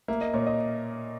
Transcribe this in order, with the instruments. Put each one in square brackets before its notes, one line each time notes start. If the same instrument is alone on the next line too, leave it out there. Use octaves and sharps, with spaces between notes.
[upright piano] A#3 [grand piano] E5
[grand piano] D#5
[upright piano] A#2 [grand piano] C#5
[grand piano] D#5